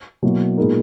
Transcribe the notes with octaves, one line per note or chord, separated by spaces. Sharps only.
B2 F#3 A#3 E4
A#2 G#3 B3 D#4 A#4